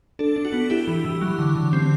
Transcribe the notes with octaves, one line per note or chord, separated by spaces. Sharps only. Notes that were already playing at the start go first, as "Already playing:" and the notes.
D4 A4
D4
F#4
B3
E4 G4
E3
E3
F#3
D3
D3
C4